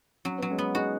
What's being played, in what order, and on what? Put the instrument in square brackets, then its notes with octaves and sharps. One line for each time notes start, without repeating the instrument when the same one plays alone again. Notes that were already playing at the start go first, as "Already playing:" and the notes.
[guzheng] F#3 [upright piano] C#4
[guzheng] F#3 [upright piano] B3
[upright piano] G#3 C#4
[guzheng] B3
[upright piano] D#4 G#4 [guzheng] F#4